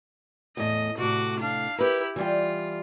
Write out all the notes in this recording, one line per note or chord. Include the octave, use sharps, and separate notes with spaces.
E2 A2 D#5
A2 C3 F#4 D6
D4 F5
E4 G4 A#4 B4
E3 G3 F4 G5